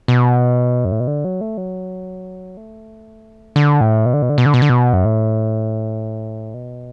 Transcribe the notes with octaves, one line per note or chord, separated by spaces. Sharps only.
B2
F#2
A2
B2
D3
F#3
A3
F#3
A3
D3
A2
B2
D3
B2
D3
B2
D3
B2
D3
B2
F#2
A2
B2